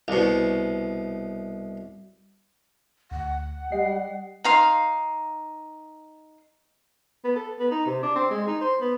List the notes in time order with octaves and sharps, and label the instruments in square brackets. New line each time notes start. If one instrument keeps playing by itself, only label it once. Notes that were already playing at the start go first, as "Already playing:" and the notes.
[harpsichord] C2 B2
[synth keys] D2 [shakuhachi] F#5
[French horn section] G3 [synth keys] D#5 G5 C7
[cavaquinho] D#4 F5 C6
[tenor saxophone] B3
A4
B3
D#4
C3
D4
C4
G#3
D#4
C5
B3